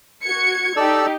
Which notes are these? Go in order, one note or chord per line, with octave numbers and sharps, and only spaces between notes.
F#4 G#6 C#7
D#4 G4 A4 D5 E6